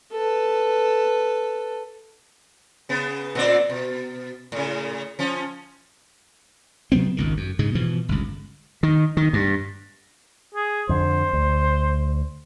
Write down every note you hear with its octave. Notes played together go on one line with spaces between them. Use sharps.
A4 B4
C#3 B3
A#2 C4 D5
B2
A2 C#3
F3 C#4
C3 F#3 B3 C4
G#1 C#2 D#3
F#2
G#2 C#3 G#3
B2 E3 F3
G1 C#2
D#3
D#3
G2
G#4
F2 D3 C5
D2